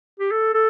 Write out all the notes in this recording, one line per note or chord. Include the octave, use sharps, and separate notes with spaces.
G4
A4
A4